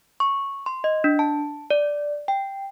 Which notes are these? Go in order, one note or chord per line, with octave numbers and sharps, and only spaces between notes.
C#6
C6
D#5
D4
A5
D5
G5